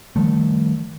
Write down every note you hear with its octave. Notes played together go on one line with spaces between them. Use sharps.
D#3 F3 G3 A3